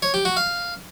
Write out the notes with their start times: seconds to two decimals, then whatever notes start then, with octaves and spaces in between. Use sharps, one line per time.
0.02 C#5
0.14 G4
0.25 F#4
0.37 F5